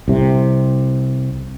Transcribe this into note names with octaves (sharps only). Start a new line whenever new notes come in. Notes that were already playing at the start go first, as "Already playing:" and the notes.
C2 C3